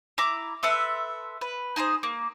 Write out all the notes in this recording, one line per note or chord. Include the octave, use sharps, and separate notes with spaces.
E4 A#5 D6
A4 B4 E5 C6
B4
D#4 G#4 B4 C5
A#3